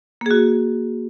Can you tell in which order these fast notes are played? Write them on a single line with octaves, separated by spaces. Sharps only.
A#3 G#4 F#4